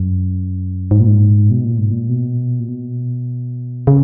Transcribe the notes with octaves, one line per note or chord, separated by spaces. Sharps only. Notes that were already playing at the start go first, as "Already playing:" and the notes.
Already playing: F#2
G#2
A#2
G#2
B2
A#2
G#2
A#2
B2
A#2
B2
C#3